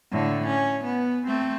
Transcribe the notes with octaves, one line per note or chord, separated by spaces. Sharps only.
A2 D3
C#4
B3
A3 C4